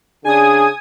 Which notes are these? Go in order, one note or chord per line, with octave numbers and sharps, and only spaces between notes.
C#3 D4 G#4 G#5 D#6